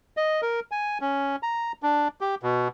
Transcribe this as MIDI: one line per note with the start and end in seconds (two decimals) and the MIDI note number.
0.17 0.41 75
0.42 0.60 70
0.71 0.98 80
1.01 1.36 61
1.43 1.72 82
1.83 2.08 62
2.21 2.35 67
2.43 2.68 47